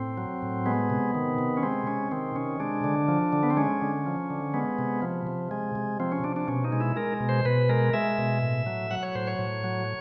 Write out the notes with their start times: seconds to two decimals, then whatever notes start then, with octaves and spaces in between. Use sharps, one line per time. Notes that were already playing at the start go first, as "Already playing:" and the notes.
Already playing: A2 C4
0.17 F#3
0.42 A2
0.66 G#3 B3
0.90 C3
1.15 D#3
1.38 C3
1.57 C#4
1.63 G#3 C4
1.87 C3 C#4
2.11 D#3 C4
2.36 C3 C#4
2.60 G#3 D4
2.84 D3
3.08 F3
3.33 D3
3.43 B3
3.50 C4
3.57 G#3 C#4
3.82 D3
4.06 F3
4.30 D3
4.54 G#3 B3
4.79 C3
5.02 F3
5.27 C3
5.51 G#3
5.75 C3
6.00 F3 C4
6.12 C#4
6.24 C3 D4
6.36 D4
6.48 B2 C#4
6.64 D#4
6.72 G#3
6.81 E4
6.96 G#3 A#4
7.20 B2
7.29 C5
7.45 B2 B4
7.69 G#3 A#4
7.93 G#3 E5
8.18 B2
8.42 A2
8.66 F#3
8.91 F#3 F#5
9.03 C#5
9.15 A2 C5
9.27 C#5
9.39 A2
9.64 F#3